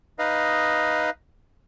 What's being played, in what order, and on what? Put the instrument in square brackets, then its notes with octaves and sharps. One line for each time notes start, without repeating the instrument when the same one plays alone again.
[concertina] D#4 B4 D#5 F5